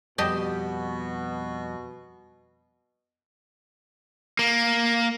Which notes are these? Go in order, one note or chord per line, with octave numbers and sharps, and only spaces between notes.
F2 B2 G3 G4 D#5 A5
A#3